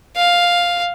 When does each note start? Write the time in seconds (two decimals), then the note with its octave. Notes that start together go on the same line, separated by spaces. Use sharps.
0.16 F5